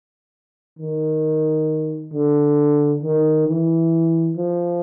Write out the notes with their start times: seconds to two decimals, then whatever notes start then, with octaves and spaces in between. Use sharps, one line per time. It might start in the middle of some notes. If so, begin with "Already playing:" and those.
0.79 D#3
2.13 D3
3.03 D#3
3.47 E3
4.37 F3